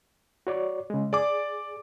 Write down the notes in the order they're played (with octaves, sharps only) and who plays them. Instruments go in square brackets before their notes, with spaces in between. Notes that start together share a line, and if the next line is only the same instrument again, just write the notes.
[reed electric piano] F#4 C#5 D5
C#3 G#3
[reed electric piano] G#4 [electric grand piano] D5 D6